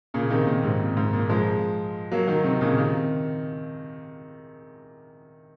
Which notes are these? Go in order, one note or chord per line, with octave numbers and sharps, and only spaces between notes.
A#2 C#3
C3 D#3
A#2
G#2 C3
A#2
G#2
A#2
F3 G#3
F#3 A#3
D#3 F#3
C3 D#3
A#2 C#3
C3 D#3